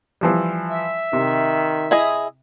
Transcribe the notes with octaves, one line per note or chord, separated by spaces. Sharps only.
E3 F3 G3
E5
C3 D#3
E4 G#4 D#5